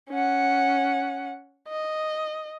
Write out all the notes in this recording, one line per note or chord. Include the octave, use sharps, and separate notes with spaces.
C#4 F#5
D#5